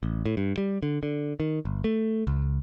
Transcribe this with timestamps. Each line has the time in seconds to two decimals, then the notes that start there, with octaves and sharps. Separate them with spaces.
0.03 A1
0.26 A2
0.37 G2
0.58 G3
0.83 D3
1.03 D3
1.40 D#3
1.65 G1
1.84 A3
2.27 C#2